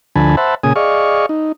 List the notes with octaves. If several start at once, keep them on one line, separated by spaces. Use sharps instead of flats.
D2 D3 F3 G#5 A5 B5
C5 E5 F#5 A5 B5
A#2 C#3 G#4 G#5 D#6
G#4 D5 D#5 F5 C#6
D#4